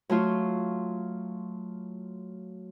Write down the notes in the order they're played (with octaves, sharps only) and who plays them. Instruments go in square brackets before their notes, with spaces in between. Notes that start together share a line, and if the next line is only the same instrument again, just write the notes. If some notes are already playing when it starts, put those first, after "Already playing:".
[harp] F#3 A3 F4